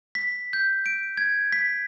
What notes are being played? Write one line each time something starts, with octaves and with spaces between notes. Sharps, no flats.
B6
G6
D7
G#6
B6